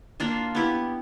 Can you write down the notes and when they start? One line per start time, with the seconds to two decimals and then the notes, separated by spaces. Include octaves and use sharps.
0.20 A#3 D4 F4
0.55 B3 E4 G4